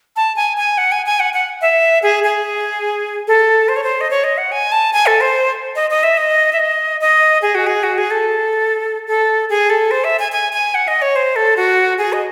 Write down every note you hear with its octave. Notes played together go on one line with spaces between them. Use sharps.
A5
G#5
G#5
F#5
G#5
G#5
F#5
F#5
E5
G#4
G#4
A4
C5
C#5
C5
D#5
C#5
D#5
F#5
G#5
A5
G#5
A4
C5
D#5
D#5
E5
D#5
E5
D#5
D#5
G#4
F#4
G#4
F#4
G#4
A4
A4
G#4
A4
C5
E5
G#5
G#5
G#5
F#5
D#5
C#5
C5
A4
F#4
G#4
D#5